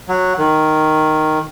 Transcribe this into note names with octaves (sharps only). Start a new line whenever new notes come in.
F#3
D#3